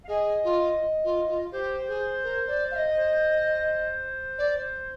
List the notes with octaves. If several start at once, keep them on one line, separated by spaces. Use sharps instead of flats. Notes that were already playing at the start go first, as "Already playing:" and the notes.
F5
G#4 D#5
F4
F4
F4
G4 C5
G#4
A#4
D5
F5
D#5
C5
D5